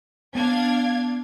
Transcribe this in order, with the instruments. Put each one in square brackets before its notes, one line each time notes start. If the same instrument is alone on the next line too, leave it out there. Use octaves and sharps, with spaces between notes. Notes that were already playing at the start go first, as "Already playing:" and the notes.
[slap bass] B3 [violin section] D4 F5 G#6